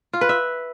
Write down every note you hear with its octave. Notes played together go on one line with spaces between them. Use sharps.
F4
B4
E5